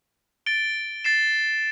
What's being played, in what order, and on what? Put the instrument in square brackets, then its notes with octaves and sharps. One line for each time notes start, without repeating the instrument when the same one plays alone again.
[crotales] A6 D7 G7
A6 C7 E7